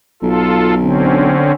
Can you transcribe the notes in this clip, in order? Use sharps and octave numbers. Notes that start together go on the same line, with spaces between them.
B1 F4 A4
D3 C4 C#4